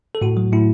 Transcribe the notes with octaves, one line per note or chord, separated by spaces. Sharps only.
A4
A2 F#4
F#3
A2 E4